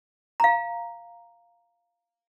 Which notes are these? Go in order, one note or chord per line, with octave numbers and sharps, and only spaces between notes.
F5 A#5